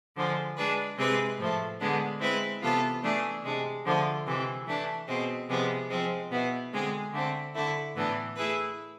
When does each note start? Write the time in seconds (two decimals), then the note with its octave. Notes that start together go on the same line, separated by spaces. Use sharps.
0.15 D3 F3 G#3
0.56 G#3 D4 G#4 B4
0.97 C3 G#3 C4 G#4 B4
1.38 A2 F3 A3
1.79 D3 G#3 B3 D4
2.20 G#3 C4 E4 B4
2.62 C3 E3 B3 F4 A4
3.03 E3 A3 D4 G#4
3.44 C3 G#3 D4
3.85 D3 F3 A3
4.26 C3 E3 G#3
4.67 E3 A3 D4
5.07 B2 G#3 C4
5.49 C3 F3 G#3 B3
5.89 F3 G#3 C4
6.31 B2 B3 E4
6.73 D3 G#3 C4 G#4
7.13 D3 A3 C4
7.54 D3 A3 E4
7.95 A2 E3 B3 D4
8.35 A3 E4 G#4 B4